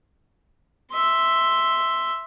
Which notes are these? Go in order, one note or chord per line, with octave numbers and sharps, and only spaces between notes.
E5 C6